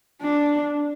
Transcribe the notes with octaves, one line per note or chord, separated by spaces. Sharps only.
D4